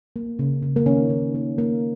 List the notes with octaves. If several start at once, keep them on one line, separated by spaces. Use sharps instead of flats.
A#3
C#3
C#3
A#3
D#3 C#4
D#3
A#3
A#3